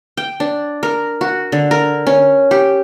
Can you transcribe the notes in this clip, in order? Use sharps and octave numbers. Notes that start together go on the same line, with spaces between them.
G5
D4
A#4
F#4
D3
A#4
C#4
G4